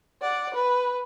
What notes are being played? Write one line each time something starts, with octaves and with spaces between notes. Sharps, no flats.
D5 F#5
B4